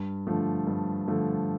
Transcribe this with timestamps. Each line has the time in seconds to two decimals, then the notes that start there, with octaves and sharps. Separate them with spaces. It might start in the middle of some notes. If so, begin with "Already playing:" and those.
Already playing: G2
0.27 D3 F3 A3
0.67 G2
1.08 D3 F3 A3